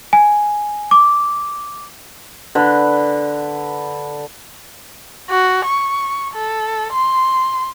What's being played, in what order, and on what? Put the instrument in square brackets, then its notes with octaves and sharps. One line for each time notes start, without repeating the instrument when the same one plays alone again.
[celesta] G#5
D6
[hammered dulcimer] D3 B4 B5
[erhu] F#4
C#6
A4
C6